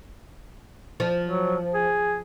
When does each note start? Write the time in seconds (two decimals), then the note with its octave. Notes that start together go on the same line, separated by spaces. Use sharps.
1.00 F3
1.27 F#3
1.74 G#4